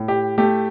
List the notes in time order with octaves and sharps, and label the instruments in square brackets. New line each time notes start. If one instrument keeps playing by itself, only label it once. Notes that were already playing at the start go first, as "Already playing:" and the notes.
Already playing: [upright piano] A2
G4
A3 G4